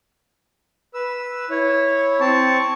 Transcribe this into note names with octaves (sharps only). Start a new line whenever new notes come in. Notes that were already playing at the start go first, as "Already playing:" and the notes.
B4 E6
E4 C#5
C4 A5 C#6